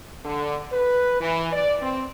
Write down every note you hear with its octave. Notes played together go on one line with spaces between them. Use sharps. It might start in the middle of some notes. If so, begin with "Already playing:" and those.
D3
B4
E3
D5
C4